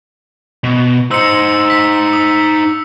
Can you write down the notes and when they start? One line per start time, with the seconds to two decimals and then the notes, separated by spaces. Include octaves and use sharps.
0.64 B2
1.11 D#4 C5 E6 C#7
1.70 B6
2.13 D#6